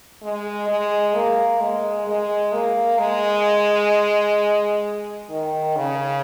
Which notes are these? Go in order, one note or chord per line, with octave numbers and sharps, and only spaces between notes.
G#3
G#3
A#3
G#3
G#3
A#3
G#3
D#3
C#3